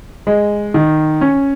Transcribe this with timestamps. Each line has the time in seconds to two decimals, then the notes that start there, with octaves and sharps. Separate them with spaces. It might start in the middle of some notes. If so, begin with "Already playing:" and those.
0.27 G#3
0.74 D#3
1.21 C#4